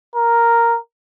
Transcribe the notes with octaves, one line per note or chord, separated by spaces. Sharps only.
A#4